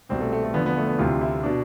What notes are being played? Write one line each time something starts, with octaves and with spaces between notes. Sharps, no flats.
C2 B2 C4
A3
A3
A3
E2 D3 F3 B3
B3
A3
B3
D2 C3 E3 F4
E4
B2 D4